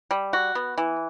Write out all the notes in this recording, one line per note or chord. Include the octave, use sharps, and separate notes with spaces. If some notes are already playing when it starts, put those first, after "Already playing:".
G3
F#4
B3
E3